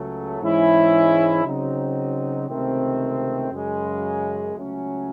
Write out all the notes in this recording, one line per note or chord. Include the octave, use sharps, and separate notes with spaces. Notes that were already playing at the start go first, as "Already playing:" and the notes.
Already playing: C#2 C#3 F#3 A3
G#2 E3 G#3 C#4 E4
C#3 F#3 C4 D#4
C#2 C3 D#3 A3 C4
F#2 C#3 G#3
C#2 C#3 F#3 A3 C#4